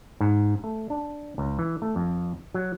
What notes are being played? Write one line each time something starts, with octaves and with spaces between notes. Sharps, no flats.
G#2
A3
D4
C#2
E3
A3
F2
F#3